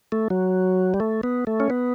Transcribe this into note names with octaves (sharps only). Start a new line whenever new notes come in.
A3
F#3
G3
A3
B3
A3
C#4
B3